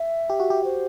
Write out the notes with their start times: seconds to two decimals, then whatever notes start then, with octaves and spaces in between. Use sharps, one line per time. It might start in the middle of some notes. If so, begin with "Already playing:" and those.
Already playing: E5
0.30 G4
0.40 F#4
0.50 G4
0.64 C5